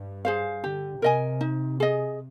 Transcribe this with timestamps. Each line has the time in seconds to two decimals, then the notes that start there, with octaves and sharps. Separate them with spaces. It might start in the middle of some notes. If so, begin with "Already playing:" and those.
Already playing: G2
0.25 G#4 C5 F5
0.63 D3 G4
1.02 C3 A#4 D#5 G#5
1.41 D#4
1.80 G#4 D#5